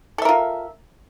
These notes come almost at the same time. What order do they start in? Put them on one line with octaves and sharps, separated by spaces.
A4 E5 A#4 F4